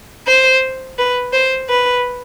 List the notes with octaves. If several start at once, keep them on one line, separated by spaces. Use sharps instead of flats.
C5
B4
C5
B4